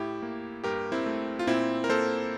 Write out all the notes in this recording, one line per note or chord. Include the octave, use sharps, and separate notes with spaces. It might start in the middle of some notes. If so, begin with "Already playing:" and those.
Already playing: A2 E4 G4
A#3
G2 G4 A#4
C4 E4
A3
F4
A#2 C4 E4
A#4
A#3 A4 C5